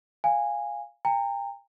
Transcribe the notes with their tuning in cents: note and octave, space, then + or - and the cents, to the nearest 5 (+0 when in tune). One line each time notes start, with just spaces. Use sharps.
F5 +0 G#5 -15
G5 +35 A#5 -25